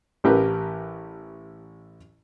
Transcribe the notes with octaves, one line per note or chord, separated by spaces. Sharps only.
A1 E3 G4 A#4 B4